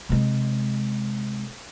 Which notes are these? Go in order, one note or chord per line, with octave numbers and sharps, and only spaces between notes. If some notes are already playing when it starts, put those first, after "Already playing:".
C3 G#3